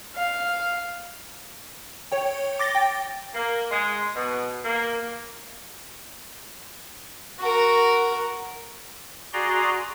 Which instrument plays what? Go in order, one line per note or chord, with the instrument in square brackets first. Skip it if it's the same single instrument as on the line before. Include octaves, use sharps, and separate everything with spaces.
[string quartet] F5
[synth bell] C#5 G5
D6 A6 A#6 G7
G5
[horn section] A#3
G#3
B2
A#3
[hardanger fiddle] F#4 A#4
[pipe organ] F#4 G#4 D5 A#5 C6